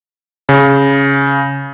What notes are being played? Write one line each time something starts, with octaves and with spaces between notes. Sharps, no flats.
C#3